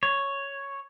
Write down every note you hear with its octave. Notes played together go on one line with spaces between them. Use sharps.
C#5